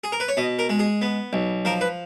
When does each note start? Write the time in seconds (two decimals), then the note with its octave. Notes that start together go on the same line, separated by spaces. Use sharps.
0.04 G#4
0.12 A#4
0.20 B4
0.28 C#5
0.37 B2 D#5
0.59 A#4
0.69 G#3
0.79 G#4
1.02 B3
1.33 B1
1.65 F3 A#4
1.81 B4